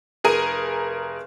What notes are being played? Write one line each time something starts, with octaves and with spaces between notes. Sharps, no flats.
F1 G#4 A#4 D#7